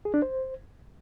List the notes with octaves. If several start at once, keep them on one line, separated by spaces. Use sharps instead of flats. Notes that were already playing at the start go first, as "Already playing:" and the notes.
G#4
D4
C5